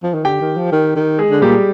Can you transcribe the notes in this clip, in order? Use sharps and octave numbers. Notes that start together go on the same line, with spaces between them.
F3
D#3
D3 G4 G5
D#3
F3
D#3
D#3
G#3 G#4
D3
A#2 G3 G4